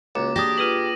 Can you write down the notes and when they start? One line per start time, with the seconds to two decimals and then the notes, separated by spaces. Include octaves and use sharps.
0.15 C#2 A#3 F#4 D6
0.36 D4 G4 G#4 D6 D#6 A#6
0.58 F4 G#4 B4 D#7 F#7